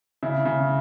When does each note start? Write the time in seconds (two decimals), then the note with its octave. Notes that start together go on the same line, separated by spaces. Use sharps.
0.23 C#3 E4
0.45 C#3